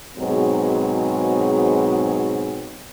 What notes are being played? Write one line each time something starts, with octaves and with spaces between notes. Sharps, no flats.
G#2 B2 F#3 C4 G#4